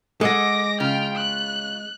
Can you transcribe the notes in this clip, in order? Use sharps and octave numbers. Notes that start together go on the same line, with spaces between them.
G#3 A4 D#5 F#5 D6 A#6
C#3 F4 G5 F6
F#6